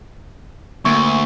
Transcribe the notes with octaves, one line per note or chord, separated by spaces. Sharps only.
D2 A#3 C#6